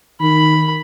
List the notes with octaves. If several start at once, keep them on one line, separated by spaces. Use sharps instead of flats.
D#3 B5